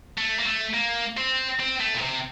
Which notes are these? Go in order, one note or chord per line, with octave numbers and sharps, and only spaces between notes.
A3
A#3
A3
A#3
C4
C4
A3
A#2
C3